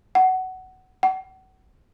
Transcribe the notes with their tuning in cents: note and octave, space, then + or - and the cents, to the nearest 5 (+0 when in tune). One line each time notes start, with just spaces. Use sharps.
F#5 +15
F#5 +35